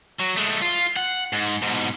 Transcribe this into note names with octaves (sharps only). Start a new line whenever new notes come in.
F#3
G#3 A3
F4
F#5
G#2
G#2 B2